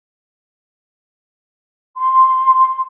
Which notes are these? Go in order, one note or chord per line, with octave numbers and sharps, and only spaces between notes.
C6